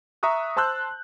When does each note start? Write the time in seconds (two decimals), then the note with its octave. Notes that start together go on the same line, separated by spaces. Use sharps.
0.23 E5 A#5 C#6 D#6 F#6
0.56 C5 A5 C6 E6 F#6 G6